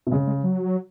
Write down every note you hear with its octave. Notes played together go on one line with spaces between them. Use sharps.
B2
C#3 G#3
G#3
F#3